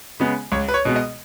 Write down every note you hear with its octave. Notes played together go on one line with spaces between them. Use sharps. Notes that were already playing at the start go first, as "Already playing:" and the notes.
C#3 G#3 B3
C#2 C#5
B4
C#5
B2 G#3 B3
D#5